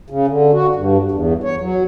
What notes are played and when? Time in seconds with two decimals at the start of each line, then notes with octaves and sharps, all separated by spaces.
0.10 C#3
0.27 D3
0.53 F#4
0.75 G2
1.12 E2
1.44 C#5
1.60 F#3